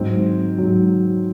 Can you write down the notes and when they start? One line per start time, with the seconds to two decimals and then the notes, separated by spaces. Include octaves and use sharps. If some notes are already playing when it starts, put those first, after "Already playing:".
Already playing: G#2 F#3 C4
0.58 G#2 F#3